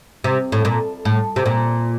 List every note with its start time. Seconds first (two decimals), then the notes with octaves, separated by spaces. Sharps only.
0.24 C3
0.52 A2
0.65 A#2
1.05 A2
1.36 C3
1.46 A#2